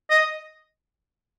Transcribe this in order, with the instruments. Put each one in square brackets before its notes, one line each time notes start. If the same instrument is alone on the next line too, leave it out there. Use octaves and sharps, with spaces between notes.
[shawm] D#5